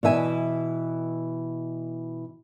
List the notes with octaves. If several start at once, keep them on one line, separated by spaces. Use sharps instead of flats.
B2 E3 E5 G#5